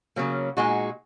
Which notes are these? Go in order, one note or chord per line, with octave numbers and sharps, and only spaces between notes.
C#3 F#3 A#3
A#2 G#3 D#4 F#4